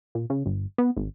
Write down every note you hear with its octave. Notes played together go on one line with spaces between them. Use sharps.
A#2
C#3
G1
B3
G#1